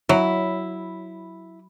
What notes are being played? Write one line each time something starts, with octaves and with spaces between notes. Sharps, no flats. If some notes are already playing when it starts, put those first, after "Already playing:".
F#3 E4